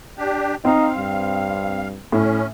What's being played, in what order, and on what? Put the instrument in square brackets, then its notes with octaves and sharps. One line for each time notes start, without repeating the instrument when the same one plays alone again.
[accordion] D4 G4
[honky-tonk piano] C4 [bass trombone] D#4 [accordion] F5
[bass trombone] G2
[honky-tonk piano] A2 [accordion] C#4